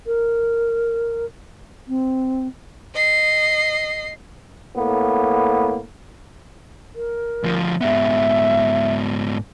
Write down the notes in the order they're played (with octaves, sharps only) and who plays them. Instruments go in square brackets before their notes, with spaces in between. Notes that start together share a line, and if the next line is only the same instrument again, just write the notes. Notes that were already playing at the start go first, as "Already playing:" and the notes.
[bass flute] A#4
C4
[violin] D#5 C7
[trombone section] A2 A#3 B3
[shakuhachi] A#4
[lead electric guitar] D2 F3
[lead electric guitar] G#2 B3 [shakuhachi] E5